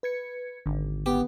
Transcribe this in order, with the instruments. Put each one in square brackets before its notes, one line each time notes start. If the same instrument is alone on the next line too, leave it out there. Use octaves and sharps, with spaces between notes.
[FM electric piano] B4 G#6 C#7
[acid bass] G#1 [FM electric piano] D3
[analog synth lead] B3 [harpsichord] G4